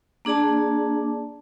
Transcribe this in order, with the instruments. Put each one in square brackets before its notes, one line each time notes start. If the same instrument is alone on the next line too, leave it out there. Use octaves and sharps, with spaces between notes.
[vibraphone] A#3 D4 G#4 D5 A5